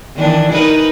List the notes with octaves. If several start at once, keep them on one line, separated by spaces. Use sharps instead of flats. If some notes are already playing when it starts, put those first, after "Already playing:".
D#3 E3 D4
D#4 A#4 B4